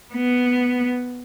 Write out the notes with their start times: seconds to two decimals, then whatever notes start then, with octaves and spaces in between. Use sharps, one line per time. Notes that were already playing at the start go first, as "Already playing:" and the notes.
0.13 B3